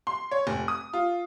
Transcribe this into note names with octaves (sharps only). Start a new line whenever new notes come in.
C6
C#5
F1
D#6
F4